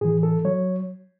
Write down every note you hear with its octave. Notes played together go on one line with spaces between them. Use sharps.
A2 E3 G#4
A4
F#3 C#5